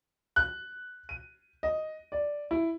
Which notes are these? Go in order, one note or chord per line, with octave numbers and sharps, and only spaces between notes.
F#6
D#7
D#5
D5
E4